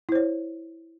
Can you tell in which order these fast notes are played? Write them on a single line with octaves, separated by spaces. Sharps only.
E4 C5 C#5